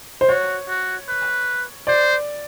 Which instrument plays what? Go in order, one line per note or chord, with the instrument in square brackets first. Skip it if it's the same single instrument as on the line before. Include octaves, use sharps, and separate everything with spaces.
[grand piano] C5
[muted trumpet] F#4 [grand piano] C#5
[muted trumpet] F#4
B4
[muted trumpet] C5 [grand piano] D5